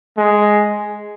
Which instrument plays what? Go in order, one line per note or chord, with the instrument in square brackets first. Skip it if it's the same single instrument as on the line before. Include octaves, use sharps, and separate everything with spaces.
[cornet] G#3